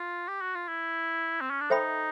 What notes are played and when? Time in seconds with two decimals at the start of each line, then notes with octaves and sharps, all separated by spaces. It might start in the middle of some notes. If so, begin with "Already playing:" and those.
Already playing: F4
0.28 G4
0.41 F#4
0.55 F4
0.68 E4
1.41 C4
1.51 C#4
1.61 D4
1.70 D#4 A4 C5 E5 G5 B5